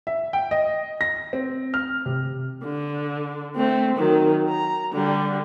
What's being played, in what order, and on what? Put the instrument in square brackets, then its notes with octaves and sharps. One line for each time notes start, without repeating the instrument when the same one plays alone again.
[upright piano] E5
G5
D#5
A#6
C4
F6
C3
[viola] D3
A3 C4
D#3 F#3
A#5
D3 G3